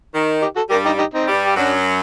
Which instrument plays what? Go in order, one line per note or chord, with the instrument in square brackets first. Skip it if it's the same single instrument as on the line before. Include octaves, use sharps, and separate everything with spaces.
[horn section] D#3
[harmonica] D#4 G4
F#4 A4
[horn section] G2 G3 [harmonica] G4 A#4
[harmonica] D#4 G4
D#4 G4
C4 D#4
[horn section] G2 G3
[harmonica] G4
[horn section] F#2 F#3 [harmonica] D4 F#4